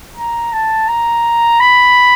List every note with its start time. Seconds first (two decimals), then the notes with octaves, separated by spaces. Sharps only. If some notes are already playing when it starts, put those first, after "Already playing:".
0.17 A#5
0.53 A5
0.88 A#5
1.60 B5